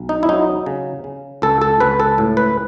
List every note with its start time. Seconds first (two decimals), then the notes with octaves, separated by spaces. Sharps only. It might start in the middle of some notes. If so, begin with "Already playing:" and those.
Already playing: B1
0.09 D#4
0.23 E4
0.29 F#3 D#4
0.66 C#3
1.04 C#3
1.42 C#2 A4
1.62 A4
1.80 C#2 B4
2.00 A4
2.18 A2
2.37 B4